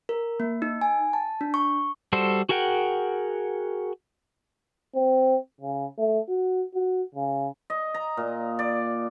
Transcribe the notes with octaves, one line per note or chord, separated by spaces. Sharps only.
A#4
A#3
D#4
G#5
A5
D4
C#6
G3 F#4 A4 C5
F#4 G#4 A#4 F#5 G5
C4
C#3
A3
F#4
F#4
C#3
D#5
A#5
A#2
D5